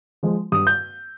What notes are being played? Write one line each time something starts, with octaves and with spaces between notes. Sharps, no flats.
F3 G#3
G2 D#6
G6